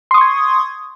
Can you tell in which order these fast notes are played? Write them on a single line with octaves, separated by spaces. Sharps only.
C6 D#6 C#6 G#6